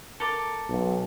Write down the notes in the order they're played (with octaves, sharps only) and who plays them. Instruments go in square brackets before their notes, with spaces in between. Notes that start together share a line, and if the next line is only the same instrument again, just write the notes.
[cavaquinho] A4 A#4 D6
[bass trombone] B1